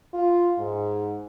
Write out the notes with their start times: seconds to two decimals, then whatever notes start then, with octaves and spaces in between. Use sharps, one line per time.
0.14 F4
0.58 G#2